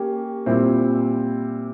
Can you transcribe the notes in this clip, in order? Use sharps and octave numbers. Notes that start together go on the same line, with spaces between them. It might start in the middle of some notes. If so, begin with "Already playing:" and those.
Already playing: A#3 C#4 G4
A#2 G3 C4 E4